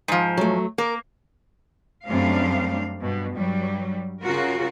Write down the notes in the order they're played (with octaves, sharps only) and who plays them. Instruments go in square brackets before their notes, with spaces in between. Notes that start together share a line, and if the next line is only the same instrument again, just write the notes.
[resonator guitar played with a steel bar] G#2 F3
[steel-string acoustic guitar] F#3 A3
[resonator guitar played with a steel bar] A#3 [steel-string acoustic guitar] A#4
[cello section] F#2 G3 A3 C4 D4 F5
G2 B2
G2 F#3 G3
C#3 F4 F#4 A#4